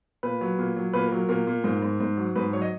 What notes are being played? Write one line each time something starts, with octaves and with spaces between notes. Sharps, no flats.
A#2 B4
F#3
A#2
F#3
A#2 B4
A#4
F#3
A#4
A#2 A#4
A#2
G#2
G#2
G#2
F#3
G#2 B4
F#3 C#5
D#5